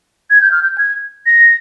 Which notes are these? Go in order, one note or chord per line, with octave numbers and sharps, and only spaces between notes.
G#6
G6
F6
G6
G#6
A#6